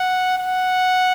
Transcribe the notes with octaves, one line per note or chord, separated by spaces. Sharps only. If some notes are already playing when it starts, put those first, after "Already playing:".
Already playing: F#5
F#5